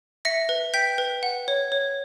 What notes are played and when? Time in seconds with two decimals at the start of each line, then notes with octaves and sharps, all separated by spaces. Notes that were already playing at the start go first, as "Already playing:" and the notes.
0.25 E5 A#6 C#7
0.49 B4
0.74 G5 G6 B6
0.98 B4
1.23 F#5
1.48 C#5
1.72 C#5